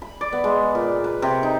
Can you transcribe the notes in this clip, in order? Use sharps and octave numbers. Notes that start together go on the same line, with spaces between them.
B5
D5
B3
G#3
A#2
B4
C3
D#4